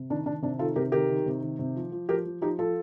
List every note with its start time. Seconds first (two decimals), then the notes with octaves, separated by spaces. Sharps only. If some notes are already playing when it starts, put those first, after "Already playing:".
Already playing: C3
0.10 D#3 D4
0.26 D#3 D4
0.42 C3 D4
0.59 D#3 F4 A4
0.76 C3 G4 A#4
0.92 D#3 G4 A#4
1.09 D#3
1.26 C3
1.42 D#3
1.59 C3
1.76 F3
1.92 F3
2.09 F3 G4 A#4
2.25 F3
2.41 F3 D#4 G4
2.59 F3 F4 A4